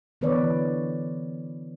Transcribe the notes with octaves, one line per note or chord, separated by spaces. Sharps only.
D3 E3 B3 B4 C#5 D5